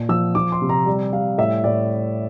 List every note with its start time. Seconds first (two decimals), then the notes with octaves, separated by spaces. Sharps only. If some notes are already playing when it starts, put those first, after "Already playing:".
Already playing: A#2
0.09 F3 E6
0.35 F3 D6
0.52 C6
0.62 C3
0.69 A#5
0.86 G3
1.12 G3 F5
1.38 A2 E5
1.64 A2 D5